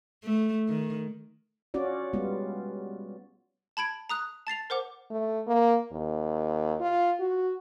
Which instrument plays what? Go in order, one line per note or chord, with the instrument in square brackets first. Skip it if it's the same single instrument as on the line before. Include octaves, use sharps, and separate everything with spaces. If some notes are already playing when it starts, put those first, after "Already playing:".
[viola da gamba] A3
D#3
[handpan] C#4 F4 F#4 D5
G3 G#3 B3 F4
[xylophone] A5 B5 G#6 D7
A#5 D#6 F#6
A5 A6 C7 F7
A#4 C5 F#5 D6
[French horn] A3
A#3
D#2
F4
F#4